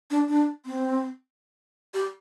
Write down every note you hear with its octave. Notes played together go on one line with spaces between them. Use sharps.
D4
D4
C4
G4